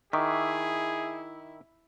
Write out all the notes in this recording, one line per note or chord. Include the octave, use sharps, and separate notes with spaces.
D#3 E4 G#4 E5 C#6 D6